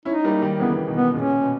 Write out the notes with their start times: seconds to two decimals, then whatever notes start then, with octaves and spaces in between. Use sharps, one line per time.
0.05 C#4 D#4 E4
0.24 G3 A#3
0.42 D#3 G3
0.60 C#3 E3 B3
0.78 C#3
0.87 B2 D#3
0.97 B3
1.14 A#2 C#3 C#4
1.41 B2